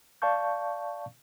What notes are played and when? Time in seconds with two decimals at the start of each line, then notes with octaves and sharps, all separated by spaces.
0.22 D5 F5 A5 C#6 G6